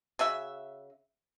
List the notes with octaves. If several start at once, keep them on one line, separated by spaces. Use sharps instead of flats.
C#3 F#4 E5